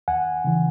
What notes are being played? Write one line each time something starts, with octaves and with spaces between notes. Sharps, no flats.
D#2 F#5 G#5
C#3 E3